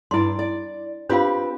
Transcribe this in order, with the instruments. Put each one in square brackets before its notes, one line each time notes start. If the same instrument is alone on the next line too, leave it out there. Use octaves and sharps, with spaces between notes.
[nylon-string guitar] G2 D5 [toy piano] E4 C6
[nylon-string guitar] D5
[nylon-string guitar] C4 G4 B4 [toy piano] D4 F4 F5